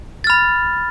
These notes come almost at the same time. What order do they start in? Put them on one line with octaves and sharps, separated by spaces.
A6 F6 B5